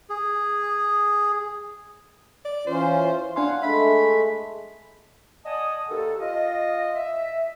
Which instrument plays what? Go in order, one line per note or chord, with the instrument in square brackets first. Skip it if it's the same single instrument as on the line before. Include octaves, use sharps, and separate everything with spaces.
[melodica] G#4
[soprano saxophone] D5
[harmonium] E3 C#4 F4 [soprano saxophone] C5
[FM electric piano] D4 G#5 C6 [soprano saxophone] F5 [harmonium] F#5
[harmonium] G#3 A3 [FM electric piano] E5 [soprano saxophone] B5
[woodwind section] D5 D#5 F#5 G#5 A5 D#6
D#2 A4
F4 D#5
E5